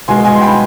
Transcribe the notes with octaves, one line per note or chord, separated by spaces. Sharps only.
B2 G#3 G#5 C6
G#5 C6
C6
G5 B5